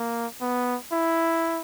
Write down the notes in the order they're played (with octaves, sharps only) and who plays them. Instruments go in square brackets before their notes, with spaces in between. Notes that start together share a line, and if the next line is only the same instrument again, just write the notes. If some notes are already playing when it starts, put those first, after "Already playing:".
Already playing: [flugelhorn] A#3
B3
E4